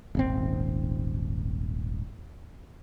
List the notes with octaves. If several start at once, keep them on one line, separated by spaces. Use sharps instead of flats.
D#1 G#1 C4